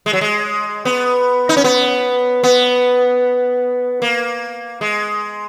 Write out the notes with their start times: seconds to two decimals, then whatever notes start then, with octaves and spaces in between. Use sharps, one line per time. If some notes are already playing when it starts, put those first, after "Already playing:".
0.06 G#3
0.13 F#3
0.21 G#3
0.85 B3
1.49 D#4
1.57 C#4
1.64 B3
2.43 B3
4.02 A#3
4.81 G#3